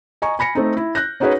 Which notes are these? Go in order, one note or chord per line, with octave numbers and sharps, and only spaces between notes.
D#5 G#5 A#5 C#6
G#5 B5 A#6 C#7
A3 C4 D#4
E4
F#6 G6 A#6
C#4 D#4 F#4 G#4 B4 C#5